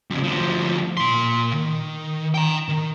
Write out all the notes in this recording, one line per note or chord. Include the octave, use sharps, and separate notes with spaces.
F2 C#3
D2 F3
A#2 C6
D#3
G5 A#5
D#3